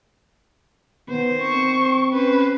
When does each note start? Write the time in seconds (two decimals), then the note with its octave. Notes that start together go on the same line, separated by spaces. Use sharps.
1.09 D#3 B3 C5
1.42 C4 C#6
2.12 C#4 B4 C5